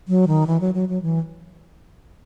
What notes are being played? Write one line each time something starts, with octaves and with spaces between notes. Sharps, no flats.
F#3
D#3
E3
F#3
F#3
F#3
E3